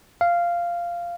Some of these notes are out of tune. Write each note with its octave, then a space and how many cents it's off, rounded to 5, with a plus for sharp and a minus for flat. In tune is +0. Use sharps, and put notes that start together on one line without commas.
F5 -10